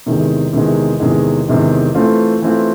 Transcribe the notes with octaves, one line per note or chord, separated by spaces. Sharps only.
E2 C3 D#3 G#3
E2 C3 D#3 G#3
E2 C3 D#3 G#3
E2 C3 D#3 G#3
E3 A3 C4 F4
E3 A3 C4 F4